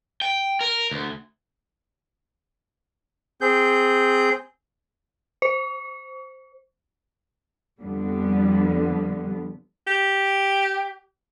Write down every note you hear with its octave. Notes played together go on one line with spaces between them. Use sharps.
G5
A#4
D2
C4 G#4 G6
C5
F2 D3 G3 B3
G4